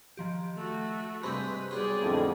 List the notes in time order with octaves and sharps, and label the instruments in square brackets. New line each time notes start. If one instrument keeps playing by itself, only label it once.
[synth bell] D#3 F3 G4
[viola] A3 F#4
[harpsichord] G2 C3 G#3 [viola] B4 [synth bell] B5 C#6 G6
[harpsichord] B1 G3 C5 [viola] G#4 D5
[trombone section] F2 A2 D3